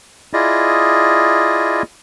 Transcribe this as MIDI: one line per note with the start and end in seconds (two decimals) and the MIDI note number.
0.33 1.82 64
0.33 1.82 65
0.33 1.82 68
0.33 1.82 74
0.33 1.82 75